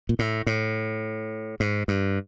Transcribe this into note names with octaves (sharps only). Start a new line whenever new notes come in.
A#2
A2
A2
G#2
G2